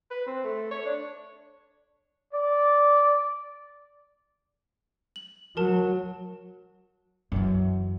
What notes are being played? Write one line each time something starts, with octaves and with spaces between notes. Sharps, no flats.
B4
C4
A3
C#5
D4
D5
F#7
F#3 A#4 A5
F#2 E3